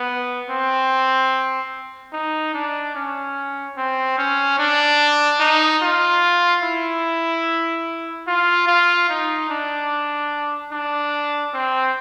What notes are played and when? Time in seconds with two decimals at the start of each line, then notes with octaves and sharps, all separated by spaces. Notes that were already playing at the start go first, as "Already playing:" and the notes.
Already playing: B3
0.50 C4
2.12 D#4
2.53 D4
2.95 C#4
3.77 C4
4.18 C#4
4.58 D4
5.40 D#4
5.82 F4
6.63 E4
8.27 F4
8.67 F4
9.09 D#4
9.49 D4
10.72 D4
11.54 C4